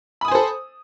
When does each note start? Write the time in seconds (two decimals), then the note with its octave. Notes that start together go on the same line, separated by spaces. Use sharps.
0.21 B5
0.25 D#6
0.28 G#5
0.32 C5
0.35 A4